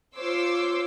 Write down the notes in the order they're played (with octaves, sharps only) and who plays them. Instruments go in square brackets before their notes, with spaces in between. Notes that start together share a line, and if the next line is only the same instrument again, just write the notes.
[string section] F4 C5 C#5 C6 D6 E6